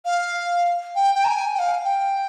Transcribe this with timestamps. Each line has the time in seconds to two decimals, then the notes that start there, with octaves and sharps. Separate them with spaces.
0.05 F5
0.95 G5
1.15 G5
1.24 A#5
1.28 G#5
1.54 G5
1.59 F5
1.85 G5